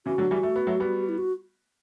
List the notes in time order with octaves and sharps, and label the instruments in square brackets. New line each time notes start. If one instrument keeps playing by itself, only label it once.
[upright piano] C#3 E3 [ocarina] F#4
[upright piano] D3 F#3
E3 G3
A3
B3
F#3 A3
G3 B3
[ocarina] E4
F#4